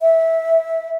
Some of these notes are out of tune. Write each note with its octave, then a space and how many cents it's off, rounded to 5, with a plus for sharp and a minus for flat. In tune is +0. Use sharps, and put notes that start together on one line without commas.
E5 -15